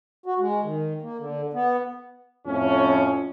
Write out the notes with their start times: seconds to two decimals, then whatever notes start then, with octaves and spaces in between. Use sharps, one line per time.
0.26 F#4
0.39 G#3
0.63 D#3
1.02 A#3
1.18 D3
1.53 B3
2.46 F2 A2 C#4